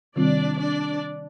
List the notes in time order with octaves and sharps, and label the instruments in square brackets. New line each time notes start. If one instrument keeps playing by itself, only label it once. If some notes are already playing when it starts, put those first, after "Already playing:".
[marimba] C3 D#3 G3 C4 F4 [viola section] D4 D5
[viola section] D4 D5